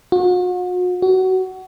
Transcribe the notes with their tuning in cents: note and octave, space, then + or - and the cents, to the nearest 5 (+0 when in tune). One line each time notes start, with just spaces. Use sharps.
F#4 -40
F#4 +20